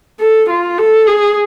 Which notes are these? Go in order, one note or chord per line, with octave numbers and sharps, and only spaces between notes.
A4
F4
A4
G#4